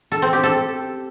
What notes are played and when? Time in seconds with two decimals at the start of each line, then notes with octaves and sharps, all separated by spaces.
0.12 A4
0.22 C4
0.33 G4
0.43 A4